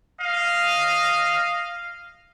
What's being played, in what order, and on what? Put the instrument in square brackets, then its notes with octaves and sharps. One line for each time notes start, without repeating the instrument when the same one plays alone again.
[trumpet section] D#5 F5